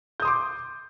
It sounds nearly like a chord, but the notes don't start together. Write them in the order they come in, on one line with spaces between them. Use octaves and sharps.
G6 D#6 C6 D6